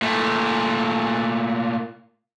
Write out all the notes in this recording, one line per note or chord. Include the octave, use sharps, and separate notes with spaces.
A#2 A3